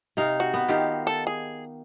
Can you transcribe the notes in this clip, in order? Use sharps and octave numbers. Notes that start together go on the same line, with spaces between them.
C3 D#4 F5
F#4
B3
D#3 F4 G4
A4
G#4